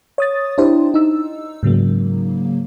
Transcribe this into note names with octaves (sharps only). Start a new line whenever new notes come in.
C#5 D#6 A6
D4 E4 G4 C5
D#4 E6
G#2 C#3 F#3 A#3